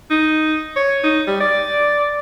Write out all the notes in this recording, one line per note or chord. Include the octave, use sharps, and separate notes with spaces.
D#4
C#5
D#4
G3
D5